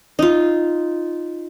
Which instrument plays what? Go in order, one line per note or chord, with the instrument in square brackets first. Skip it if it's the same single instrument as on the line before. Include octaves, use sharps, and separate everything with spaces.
[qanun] D#4 F4